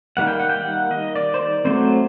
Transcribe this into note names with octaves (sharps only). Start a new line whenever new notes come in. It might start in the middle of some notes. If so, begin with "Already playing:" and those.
D#3 G3 A#3 F#5
G5
F#5
G5
F#5
D#5
D5
C5
D5
F#3 A3 C4 C5